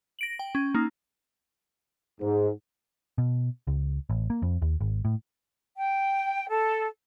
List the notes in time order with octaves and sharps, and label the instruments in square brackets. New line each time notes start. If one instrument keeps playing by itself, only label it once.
[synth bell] A#6 D7 F#7
G5
C#4
A#3 D#4
[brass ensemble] G#2
[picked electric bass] B2
C#2
A1
A#3
F2
D#2
G#1
A2
[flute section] G5
A4